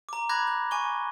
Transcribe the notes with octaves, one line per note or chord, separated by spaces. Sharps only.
A#5 D6
B5 D6 F#6 G#6 A#6
G6
G#5 C#6 D6 G7